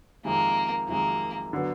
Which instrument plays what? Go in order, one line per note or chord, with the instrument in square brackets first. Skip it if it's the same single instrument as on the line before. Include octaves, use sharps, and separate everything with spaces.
[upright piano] F2 C3 D#3 G#3 [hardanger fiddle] A#3
[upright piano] F2 C3 D#3 G#3 [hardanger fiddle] A#3
[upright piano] D3 F#3 B3